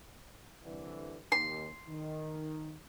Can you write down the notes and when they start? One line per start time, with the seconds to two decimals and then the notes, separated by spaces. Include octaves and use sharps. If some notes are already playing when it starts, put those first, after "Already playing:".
0.63 C2 D3 E3
1.32 D#2 C6
1.88 D#3